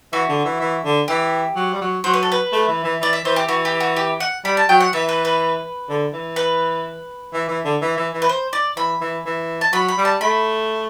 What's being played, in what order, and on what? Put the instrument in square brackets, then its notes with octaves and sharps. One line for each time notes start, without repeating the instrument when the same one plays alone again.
[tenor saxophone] E3 [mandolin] F#4
[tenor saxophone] D3
E3
E3
D3
[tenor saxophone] E3 [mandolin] G4
[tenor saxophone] F#3
G3
F#3
[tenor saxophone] F#3 [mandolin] C5
[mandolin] B4
A4
B4
[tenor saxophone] A3
E3
E3
[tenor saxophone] E3 [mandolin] D5
[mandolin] E5
[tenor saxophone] E3 [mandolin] C5
[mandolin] G4
[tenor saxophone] E3 [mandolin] F#4
[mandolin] G4
F#4
G4
F#5
[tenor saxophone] G3 [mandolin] B5
[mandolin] A5
[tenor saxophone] F#3 [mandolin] G5
[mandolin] F#5
[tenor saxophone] E3 [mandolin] E5
[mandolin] B4
B4
[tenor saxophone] D3
E3
[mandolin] B4
[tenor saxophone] E3
E3
D3
E3
E3
E3
[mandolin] B4
C5
D5
[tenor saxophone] E3 [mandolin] B5
[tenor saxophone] E3
E3
[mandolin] A5
[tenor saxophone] F#3 [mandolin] B5
[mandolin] B5
[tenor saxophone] G3
[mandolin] A5
[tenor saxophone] A3 [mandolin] B5